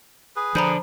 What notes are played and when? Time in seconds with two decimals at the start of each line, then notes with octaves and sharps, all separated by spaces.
0.36 G#4 B4
0.55 D3 F3 A#5 B5 G6